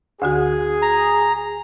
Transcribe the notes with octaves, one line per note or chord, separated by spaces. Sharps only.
D2 D3 F#4 G#4
A#5